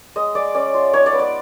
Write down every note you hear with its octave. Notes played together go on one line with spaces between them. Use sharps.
G#3 D#5
G#3 D5
C#4 D5
F4
D#4 C#5
D5
B3
D5